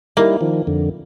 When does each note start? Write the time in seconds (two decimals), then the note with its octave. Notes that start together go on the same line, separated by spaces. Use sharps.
0.17 G3 A#3 D#4 E4
0.41 D#3 F3
0.67 F2 D3